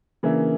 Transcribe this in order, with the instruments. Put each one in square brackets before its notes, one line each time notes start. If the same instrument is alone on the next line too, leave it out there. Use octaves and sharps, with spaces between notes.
[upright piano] C#3 E3 [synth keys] A#3 D4 A#4 E5